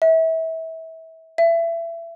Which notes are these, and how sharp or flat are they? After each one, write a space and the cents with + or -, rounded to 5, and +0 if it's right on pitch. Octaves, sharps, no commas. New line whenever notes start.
E5 -30
E5 +25